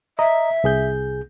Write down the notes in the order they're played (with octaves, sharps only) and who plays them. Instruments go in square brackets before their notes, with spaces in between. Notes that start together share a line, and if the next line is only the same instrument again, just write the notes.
[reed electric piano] D#5 A#5 [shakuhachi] E5
[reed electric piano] C2 G#4 G6